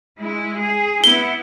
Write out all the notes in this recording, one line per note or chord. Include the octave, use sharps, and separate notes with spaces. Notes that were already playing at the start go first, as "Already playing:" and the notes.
G#3 E4
G#4
B3 E4 G7